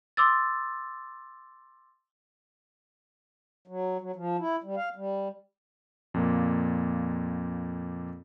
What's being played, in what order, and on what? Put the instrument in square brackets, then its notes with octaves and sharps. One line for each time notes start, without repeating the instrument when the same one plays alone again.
[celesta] C6 D6 E6 A6
[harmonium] F#3
F#3
F3
E4
G3
F5
G3
[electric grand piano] F2 A#2 A#3